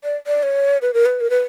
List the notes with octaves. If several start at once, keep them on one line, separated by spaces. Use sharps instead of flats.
D5
D5
C#5
B4
A#4
B4
A#4
B4